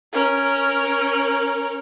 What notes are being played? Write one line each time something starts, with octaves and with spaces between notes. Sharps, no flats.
C#4 A#4